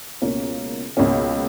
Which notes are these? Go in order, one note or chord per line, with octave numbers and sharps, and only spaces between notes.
C#2 B2 A#3 C#4
C#2 B2 A#3 C#4